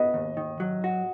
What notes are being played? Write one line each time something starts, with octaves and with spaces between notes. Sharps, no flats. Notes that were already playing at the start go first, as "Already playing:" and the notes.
Already playing: B3 D#5
D#2
D#3
F#3
F#4